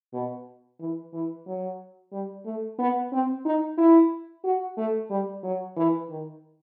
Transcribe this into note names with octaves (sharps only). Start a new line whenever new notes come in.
B2
E3
E3
F#3
G3
A3
B3
C4
D#4
E4
F#4
A3
G3
F#3
E3
D#3